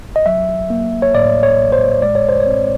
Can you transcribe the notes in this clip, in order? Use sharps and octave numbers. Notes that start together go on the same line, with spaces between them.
D#5
F#3 E5
A#3
C#5
A2 D5
C#5
A1
C5
G#3 D5
C#5
C5
C#5
C4